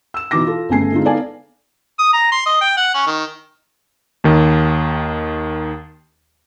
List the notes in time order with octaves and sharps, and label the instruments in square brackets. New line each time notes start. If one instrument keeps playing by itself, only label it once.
[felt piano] E6 E7
B2 E3 D#4 D6 A#6
F4 A4
G1 C#3 A3 G#5 C7
D3 G#3 C4 D#4 F4
B3 D#4 A4 D5 F5 G#5
[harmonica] D#6
A#5
C6
D#5
G5
F#5
C#4
D#3
[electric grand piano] D#2 D#3